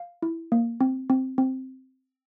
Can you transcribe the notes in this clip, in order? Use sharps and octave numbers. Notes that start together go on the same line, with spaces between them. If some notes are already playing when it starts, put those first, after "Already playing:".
Already playing: F5
E4
A#3
C4
C4
C4